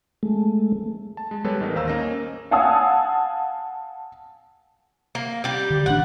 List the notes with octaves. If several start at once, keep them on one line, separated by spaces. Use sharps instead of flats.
G#3 A3
A5
G#3
G3 G#3 B3 A4 B4 C#5
A1 D#4 A#4
D#2 C5 F5 A#5 E6
A#3 C#4 D#5 A#6
F5 F#5 G#5 A5 D#6 E6
A#3
G3 G4
D3
A1 D4 F#5